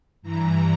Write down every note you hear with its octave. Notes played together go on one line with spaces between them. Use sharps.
G2 E3 A#5